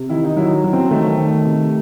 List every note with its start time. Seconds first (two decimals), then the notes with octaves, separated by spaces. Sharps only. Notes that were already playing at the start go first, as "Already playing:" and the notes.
Already playing: C3
0.09 D#3 E4
0.24 D#4
0.37 F#3 E4
0.64 F#3
0.73 C4
0.91 D#3 A3
1.18 D#3
1.45 C3